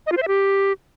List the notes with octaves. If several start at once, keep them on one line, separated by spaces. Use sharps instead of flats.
D#5
F4
C5
E5
G4